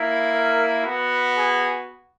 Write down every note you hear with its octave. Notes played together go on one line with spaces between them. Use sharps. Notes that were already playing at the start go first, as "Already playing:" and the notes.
Already playing: A#3 E4
A#4
B3 F#4
G#4